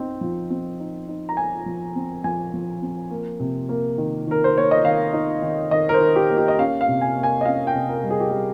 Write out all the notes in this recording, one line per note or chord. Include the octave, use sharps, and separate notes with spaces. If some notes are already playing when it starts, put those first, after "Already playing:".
Already playing: C4 D#4
F3
C4
D#4
D#4
A#5
D#4 G#5
F3
C4
F3 G#5
F3
C4
A#3
C3
A#3
D#3
D#3 A#4
C5
A#3 C#5
D#5
D#3 F5
D#4
D#3
D#3 D#5
A#4
C5
D#3
G4
A#3
G4
D#5
C#4 F5
F5
C3
G#5
A#3
G#5
D#5
C#4 F5
G5
C3
A#4
G3
G#4
G4
G3 G#4